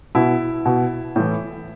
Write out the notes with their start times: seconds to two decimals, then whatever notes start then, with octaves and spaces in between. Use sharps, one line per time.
0.15 B2 E4
0.66 B2
1.16 A2 E3